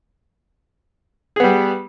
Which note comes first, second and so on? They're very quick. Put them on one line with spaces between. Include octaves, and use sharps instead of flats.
G#4 B3 G3